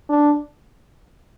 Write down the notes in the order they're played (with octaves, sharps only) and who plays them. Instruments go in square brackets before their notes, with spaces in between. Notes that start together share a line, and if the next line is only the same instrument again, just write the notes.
[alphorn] D4